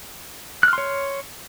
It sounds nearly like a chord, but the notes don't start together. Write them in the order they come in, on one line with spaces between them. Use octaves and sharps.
F#6 F6 C6 C#5